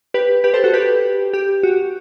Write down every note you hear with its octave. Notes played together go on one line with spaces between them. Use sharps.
G4 B4
G4 B4
A4 C5
F#4 A4
G4 B4
G4
F#4